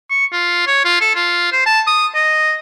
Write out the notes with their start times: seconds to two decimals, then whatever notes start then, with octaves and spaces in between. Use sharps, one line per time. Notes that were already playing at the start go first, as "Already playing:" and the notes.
0.10 C#6
0.32 F4
0.67 C#5
0.85 F4
1.01 A4
1.15 F4
1.52 C5
1.66 A5
1.87 D#6
2.15 D#5